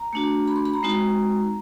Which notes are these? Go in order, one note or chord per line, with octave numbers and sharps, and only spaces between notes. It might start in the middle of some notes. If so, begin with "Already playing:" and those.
Already playing: A#5
A3 D4 F#4
B5
C6
B5
A#5
G#3 C4 D#4 F#4